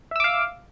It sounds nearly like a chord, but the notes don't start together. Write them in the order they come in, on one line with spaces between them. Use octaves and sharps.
E5 E6 D6 F5